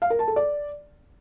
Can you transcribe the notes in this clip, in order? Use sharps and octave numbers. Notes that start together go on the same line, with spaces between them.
F5
A#4
A5
A4
D5